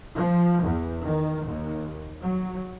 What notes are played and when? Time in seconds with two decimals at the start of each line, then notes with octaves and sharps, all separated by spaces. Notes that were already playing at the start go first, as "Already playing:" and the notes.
0.16 F3
0.63 E2
1.03 D#3
1.46 D#2
2.22 F#3